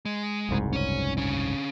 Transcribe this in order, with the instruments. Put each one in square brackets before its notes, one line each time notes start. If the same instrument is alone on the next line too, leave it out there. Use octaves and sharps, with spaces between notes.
[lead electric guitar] G#3
[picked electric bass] F#1 C2 G#2
[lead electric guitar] C#4 C#5
D3 C#4